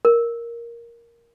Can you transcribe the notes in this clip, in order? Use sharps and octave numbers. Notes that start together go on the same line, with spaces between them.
A#4